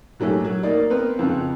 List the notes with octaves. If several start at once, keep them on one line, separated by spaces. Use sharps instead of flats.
G#2 F#3 A3 C#4 G4
F#3
A#3 D#4 D5
B3 C4 A#4 B4
F2 C#3